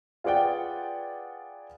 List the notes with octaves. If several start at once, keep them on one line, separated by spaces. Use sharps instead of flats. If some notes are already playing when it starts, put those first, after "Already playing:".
F4 G#4 B4 D5 F#5 G5